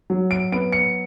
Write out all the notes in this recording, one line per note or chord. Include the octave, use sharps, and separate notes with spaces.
F#3
D7
B3 D7
C#7